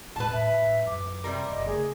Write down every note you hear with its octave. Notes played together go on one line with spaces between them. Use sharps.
E1 A2 G#3 B4 A5
A2 E5
F#2 D6
C3 G3 A#4
F#1 D#5
C#3 A3 G#4